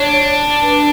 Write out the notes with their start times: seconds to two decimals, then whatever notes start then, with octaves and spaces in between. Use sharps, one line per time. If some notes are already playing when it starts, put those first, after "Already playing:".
Already playing: D4 C#5
0.62 B4